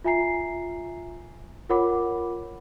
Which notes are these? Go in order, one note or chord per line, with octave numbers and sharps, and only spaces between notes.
F4 E5 G#5 A#5 C7
F4 A#4 C#5 F#5 B5 D6